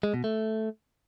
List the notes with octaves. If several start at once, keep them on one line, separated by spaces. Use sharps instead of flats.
G#3
B2
A3